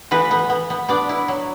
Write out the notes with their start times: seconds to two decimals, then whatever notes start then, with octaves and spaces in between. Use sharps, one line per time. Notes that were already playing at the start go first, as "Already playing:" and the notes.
0.11 E3 B3 B4
0.31 B3
0.50 B3
0.70 B3
0.89 B3 D4 D5
1.09 E4
1.28 F#3